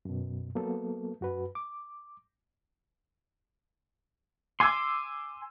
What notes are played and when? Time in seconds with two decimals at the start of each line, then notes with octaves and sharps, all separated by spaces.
0.05 F#2 B2
0.55 F#3 A#3 B3 A4
1.20 F#2 F#4 B4
1.55 D6
4.60 G#5 C6 D6 E6